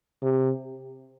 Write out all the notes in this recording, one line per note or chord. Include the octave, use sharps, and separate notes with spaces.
C3